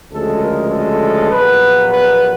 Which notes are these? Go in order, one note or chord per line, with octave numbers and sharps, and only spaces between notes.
D2 C#3 F3 G#3 A4
A#4
A4
A#1 A#2 F#3 B3 B4
B4